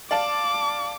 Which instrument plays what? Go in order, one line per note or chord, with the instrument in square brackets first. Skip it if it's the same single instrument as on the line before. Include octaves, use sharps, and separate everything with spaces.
[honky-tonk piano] D5 F5 A5 [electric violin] D6